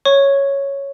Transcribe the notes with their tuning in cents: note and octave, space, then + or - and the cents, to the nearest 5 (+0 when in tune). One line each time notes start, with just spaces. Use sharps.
C#5 +0 C#6 -5